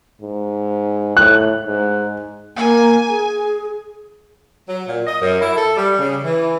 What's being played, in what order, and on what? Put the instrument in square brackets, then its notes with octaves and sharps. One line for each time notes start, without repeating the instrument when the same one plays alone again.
[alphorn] G#2
[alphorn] A2 [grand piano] F#6
[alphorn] G#2
[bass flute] A#3 [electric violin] G#5
[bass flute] G#4
[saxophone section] F#3
A#2
D#5
F#2
E4
A4
G3
C#3
E3